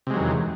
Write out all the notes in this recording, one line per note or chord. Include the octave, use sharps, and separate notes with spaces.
E2 C3 D#3 F#3 G#3